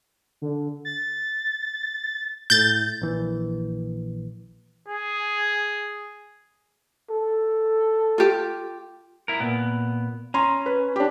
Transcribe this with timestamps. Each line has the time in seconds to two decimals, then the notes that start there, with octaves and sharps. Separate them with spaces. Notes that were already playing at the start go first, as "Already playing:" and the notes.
0.42 D3
0.85 A6
2.50 A2 G6 A6
3.02 A#1 E3
4.88 G#4
7.10 A4
8.18 F4 G4
9.28 E4 A#4
9.40 A#2 B3
10.34 C#4 A#5 C6
10.66 B4
10.96 D4 G4